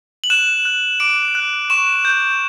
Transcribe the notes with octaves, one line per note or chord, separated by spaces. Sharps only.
F#7
F#6 E7
F#6
D6 D7
F#6
C#6 E7
G6